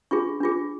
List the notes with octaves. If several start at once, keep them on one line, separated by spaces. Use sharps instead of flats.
D4 F4 G#4 C#6
D4 F4 G#4